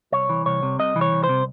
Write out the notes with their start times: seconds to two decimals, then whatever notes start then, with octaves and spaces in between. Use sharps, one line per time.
0.12 C2 C#5
0.29 E3
0.46 C2 C#5
0.63 C3
0.79 C2 D#5
0.96 E3
1.01 C#5
1.12 C2
1.24 C5
1.29 C3